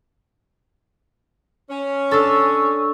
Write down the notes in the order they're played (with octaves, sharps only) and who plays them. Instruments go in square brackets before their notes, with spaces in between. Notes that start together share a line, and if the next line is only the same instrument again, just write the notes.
[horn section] C#4
[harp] D4 A4 [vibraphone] C#6 E6